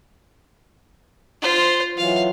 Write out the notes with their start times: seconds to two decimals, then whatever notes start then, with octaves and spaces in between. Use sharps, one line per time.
1.42 F4 C5
1.97 E3 F#3 F4 F5